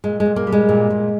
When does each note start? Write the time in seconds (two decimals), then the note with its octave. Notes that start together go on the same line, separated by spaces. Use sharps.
0.04 A#2 G#3
0.20 G#3
0.26 A#2
0.36 A#3
0.47 G3
0.52 G#3
0.69 A#2
0.90 A#2